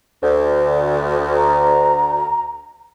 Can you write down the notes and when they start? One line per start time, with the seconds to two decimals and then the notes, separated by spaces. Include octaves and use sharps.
0.23 D2
1.36 A#5